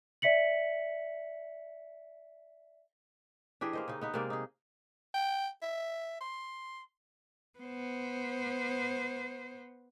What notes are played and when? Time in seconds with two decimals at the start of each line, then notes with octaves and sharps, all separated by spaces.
0.22 D5 E5 B6 C#7 F#7
3.61 E3 D4 G4 G#4
3.73 A#3 C5 D#5
3.88 C#3 D#4
4.01 B3 D#4 B4
4.14 C3 G#3 A#3 D5
4.30 D#4 G#4
5.14 G5
5.62 E5
6.21 C6
7.59 B3 C5